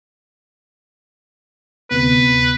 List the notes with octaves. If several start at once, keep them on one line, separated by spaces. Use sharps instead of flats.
D2 C3 B3 B4